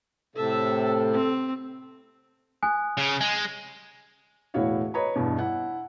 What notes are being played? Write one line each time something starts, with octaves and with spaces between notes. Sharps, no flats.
A2 C3 A4 E5 A5
C4
G#5 D#6 F#6
C#3
G#3
E1 A2 E4 F#4 C#5 F5
B4 C#5 D#5 A#5 B5
E2 G2 B2
E4 F#5